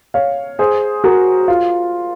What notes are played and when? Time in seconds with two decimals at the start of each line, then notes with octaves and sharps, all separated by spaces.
0.14 C#5 F5
0.59 G#4 C5
1.04 F#4 A#4
1.48 F4